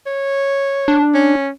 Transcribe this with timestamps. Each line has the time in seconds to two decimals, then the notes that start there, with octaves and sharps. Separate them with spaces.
0.06 C#5
0.88 D4
1.14 C#4